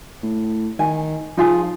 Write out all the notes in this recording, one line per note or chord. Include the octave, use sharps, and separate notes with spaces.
A2
D#3 G#5
F3 D#4 F4 G#4